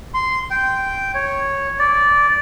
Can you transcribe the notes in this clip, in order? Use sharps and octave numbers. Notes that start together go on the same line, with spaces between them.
C6
G5
C#5
D5